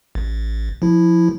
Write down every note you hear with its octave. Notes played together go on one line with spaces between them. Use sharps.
A1
F3 E4